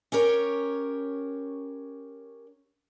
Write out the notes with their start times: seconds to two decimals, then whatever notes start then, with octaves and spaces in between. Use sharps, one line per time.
0.12 C#4 G4 A#4 C#5